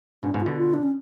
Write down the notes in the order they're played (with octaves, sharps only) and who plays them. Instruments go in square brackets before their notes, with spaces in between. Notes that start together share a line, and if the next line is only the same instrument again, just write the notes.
[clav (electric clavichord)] G#2 B2 [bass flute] D4
[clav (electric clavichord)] G#2 B2
[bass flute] F4
[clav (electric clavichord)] B2 D3 [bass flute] F#4
[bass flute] F4
D4
C#4